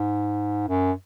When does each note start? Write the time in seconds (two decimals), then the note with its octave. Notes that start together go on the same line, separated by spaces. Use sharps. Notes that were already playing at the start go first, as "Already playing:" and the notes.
Already playing: G#2
0.68 F#2